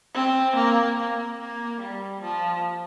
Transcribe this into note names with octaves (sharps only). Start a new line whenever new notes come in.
C4
A#3
A#3
A#3
G3
F3